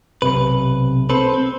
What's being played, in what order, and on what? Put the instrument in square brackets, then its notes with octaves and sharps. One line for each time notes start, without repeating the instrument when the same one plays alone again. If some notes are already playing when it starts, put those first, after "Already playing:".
[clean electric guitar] B1 G2 B4 [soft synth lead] C3
[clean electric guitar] C4 A4 B4 [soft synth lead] C5
[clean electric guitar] C4